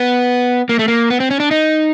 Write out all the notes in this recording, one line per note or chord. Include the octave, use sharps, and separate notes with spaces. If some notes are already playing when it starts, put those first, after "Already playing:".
Already playing: B3
A#3
A3
A#3
B3
C4
C#4
D4
D#4